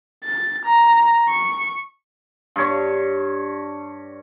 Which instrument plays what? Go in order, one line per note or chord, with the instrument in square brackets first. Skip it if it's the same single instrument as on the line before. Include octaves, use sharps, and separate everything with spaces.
[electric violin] A6
A#5
C#6
[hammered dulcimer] G2 C#5